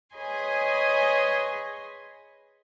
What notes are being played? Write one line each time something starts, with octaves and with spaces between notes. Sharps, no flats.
G#4 B4 C#5 D#5 G#5 C6